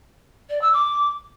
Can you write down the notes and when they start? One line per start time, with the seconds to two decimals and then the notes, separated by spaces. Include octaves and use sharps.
0.50 D5
0.61 E6
0.73 D6